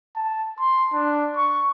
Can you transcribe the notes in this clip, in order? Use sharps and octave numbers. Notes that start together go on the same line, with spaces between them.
A5
C6
D4
C#6